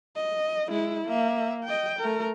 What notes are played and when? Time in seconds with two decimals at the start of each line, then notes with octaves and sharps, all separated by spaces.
0.16 D#5
0.70 G#3 E4
1.07 A#3 E5
1.64 D#5 G5
2.00 A3 A#4